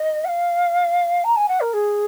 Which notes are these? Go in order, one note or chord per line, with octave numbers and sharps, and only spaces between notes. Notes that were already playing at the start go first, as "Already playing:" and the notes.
Already playing: D#5
F#5
F5
A#5
G#5
F#5
A#4
G#4